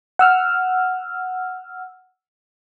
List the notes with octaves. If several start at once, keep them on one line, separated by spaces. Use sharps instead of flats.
F#5 E6 F6